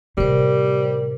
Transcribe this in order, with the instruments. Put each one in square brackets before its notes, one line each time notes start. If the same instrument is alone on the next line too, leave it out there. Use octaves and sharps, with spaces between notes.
[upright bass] A2 C3 [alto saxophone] G3 [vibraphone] A#4 C5